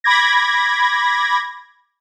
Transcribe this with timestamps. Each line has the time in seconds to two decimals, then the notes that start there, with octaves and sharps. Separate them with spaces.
0.04 B5 D6 G#6 A#6